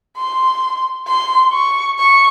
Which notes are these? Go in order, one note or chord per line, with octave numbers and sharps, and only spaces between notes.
C6
C6
C#6
C#6